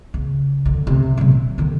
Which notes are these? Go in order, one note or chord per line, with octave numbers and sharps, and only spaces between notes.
C#3
F2 D3
C3
A#2 F#3
E1
D3 D#3